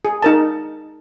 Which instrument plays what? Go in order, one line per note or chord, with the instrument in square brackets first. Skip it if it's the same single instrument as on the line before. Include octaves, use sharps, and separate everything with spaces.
[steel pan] G#4
D#4 A#4 A5